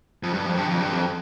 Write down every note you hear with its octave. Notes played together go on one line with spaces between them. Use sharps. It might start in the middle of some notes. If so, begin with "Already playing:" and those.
F2
G2
F2
G2
F2
G2
F2